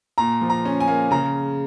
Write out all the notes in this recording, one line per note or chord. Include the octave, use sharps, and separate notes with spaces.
A#2 A#5
F3
A#5
C#4
G#5
A#3
C#3 A#5